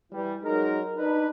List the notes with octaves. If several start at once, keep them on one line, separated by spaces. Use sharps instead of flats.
E3 G3
F#3 G#3 D#4 G#4 A#4
D4 D#4 B4